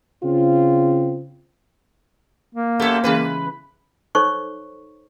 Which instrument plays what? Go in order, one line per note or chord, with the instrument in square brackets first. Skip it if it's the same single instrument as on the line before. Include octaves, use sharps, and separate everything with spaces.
[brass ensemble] C#3 C4 F4
[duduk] A#3
[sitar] F#2 G4 A4 [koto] B3 C#5
[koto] C#3 E3 G#3 [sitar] B4
[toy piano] D#4 A4 C5 C#5 C#6 D6